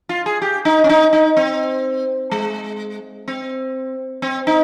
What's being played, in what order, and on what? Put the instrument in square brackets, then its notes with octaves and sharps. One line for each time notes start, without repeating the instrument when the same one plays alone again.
[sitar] F4
G#4
G4
D#4
C#4
D#4
D#4
C4
G#3
C4
C4
D#4